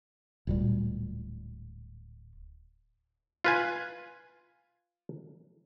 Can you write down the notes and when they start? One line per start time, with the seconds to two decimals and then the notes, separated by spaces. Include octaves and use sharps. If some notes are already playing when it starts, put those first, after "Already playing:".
0.47 D1 A#2 G3
3.45 F4 B4 G#5